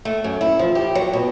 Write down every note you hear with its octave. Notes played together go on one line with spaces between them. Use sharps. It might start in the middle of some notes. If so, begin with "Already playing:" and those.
A3
F#2
E4
F3
G4
F#3
B2